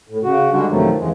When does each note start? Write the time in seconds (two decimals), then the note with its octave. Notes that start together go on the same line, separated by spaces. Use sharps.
0.09 A2
0.23 C#3 F#4
0.51 D3 G3 G#3 D4 F#4
0.68 F#2 C3 D#3 F3 F#3 A3
0.98 E2 C#3 E3 G#3